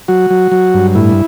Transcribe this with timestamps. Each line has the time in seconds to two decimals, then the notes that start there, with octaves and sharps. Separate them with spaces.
0.08 F#3 F#4
0.30 F#3
0.52 F#3
0.74 G2
0.95 A2 E4